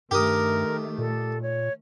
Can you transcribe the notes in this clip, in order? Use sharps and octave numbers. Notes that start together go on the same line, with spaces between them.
G2 D#3 A3 G4 A#4 D#6
A#2 A4
C#5